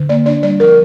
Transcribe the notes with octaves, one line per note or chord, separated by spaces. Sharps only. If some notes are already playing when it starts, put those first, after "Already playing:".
Already playing: D3
A#3 D5
D4 D5
G3 D5
F3 A#4